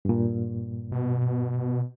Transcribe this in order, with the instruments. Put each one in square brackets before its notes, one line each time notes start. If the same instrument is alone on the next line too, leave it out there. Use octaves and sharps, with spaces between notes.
[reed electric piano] G2 A#2
[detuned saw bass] B2